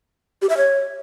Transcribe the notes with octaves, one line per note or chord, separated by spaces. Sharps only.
G4
E5
C#5